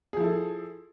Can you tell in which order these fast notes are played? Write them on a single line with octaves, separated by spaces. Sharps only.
G#4 F3 E4 A4